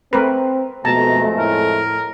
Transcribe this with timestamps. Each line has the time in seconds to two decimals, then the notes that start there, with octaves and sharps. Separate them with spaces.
0.13 A3 C4 A#4 B4
0.85 F2 B2 G#3 A3 A5 A#5
1.38 A2 A#4